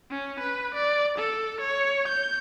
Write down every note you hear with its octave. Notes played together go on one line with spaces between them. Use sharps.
C#4
B4
D5
A4
C#5
G6